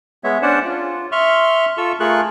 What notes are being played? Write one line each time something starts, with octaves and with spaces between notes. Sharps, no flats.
G#3 B3 C#5 E5
C#4 D4 C5 D5 F#5 A5
F4
E5 C6 C#6 F6
F4 A4 C#6 E6
A3 F4 G#4 A#4 C#6 F#6